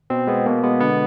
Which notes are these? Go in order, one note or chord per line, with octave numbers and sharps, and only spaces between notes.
B2 C4
G#3 B3
B2 A#3
G#3 B3
D3 B3